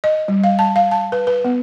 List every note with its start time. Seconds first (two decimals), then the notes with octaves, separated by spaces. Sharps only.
0.04 D#5
0.28 G3
0.44 F5
0.59 A5
0.76 F5
0.91 A5
1.12 B4
1.27 B4
1.45 B3